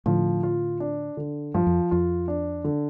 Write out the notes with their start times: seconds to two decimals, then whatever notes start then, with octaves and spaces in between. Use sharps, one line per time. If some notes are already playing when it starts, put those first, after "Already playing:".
0.06 A2 D3 F3
0.43 F4
0.80 D4
1.17 D3
1.54 G2 F3
1.67 F2
1.91 F2 F4
2.28 D4
2.64 D3